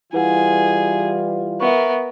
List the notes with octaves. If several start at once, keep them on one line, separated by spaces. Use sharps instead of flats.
E3 G3 E4 F4 G#4 B4 F#5
B3 A#4 E5 C#6